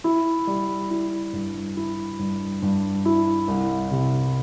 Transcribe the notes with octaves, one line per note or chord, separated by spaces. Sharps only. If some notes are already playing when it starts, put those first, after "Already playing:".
E4
G3
E4
G2
E4
G2
G2
E4
C2
C3